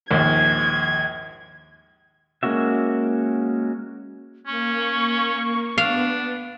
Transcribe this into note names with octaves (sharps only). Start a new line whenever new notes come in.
A#1 D#2 G#2 G#6
G#3 A#3 C#4 F#4 E5
A#3 C#4 C#6
B3 D4 F5